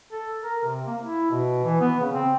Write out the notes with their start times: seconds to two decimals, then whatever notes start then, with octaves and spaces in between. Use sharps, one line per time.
0.12 A4
0.44 A#4
0.64 C3
0.87 A#3
1.01 E4
1.30 B2
1.63 E3
1.80 B3
2.00 C#3
2.14 C4